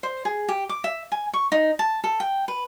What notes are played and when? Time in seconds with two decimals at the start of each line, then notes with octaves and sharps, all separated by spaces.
0.03 C5
0.25 G#4
0.48 G4
0.69 D6
0.84 E5
1.12 G#5
1.33 C#6
1.52 D#4
1.79 A5
2.04 A4
2.20 G5
2.48 B4